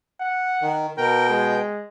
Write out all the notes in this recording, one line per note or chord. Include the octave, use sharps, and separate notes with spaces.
F#5
D#3
B2 A#4 G5
G#3